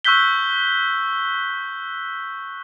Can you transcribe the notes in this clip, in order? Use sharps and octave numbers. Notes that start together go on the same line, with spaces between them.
C#6 E6 F#6 G6 B6 G7